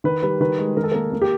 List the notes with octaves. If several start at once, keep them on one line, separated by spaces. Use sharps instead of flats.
D#3 B4
G3 B4
D#3 B4
G#3
D#3 A#4
A4
A#3 A#4
A#3
G4